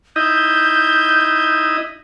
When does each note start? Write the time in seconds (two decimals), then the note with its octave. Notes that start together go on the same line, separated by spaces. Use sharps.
0.16 D#4 E4 D#5 G6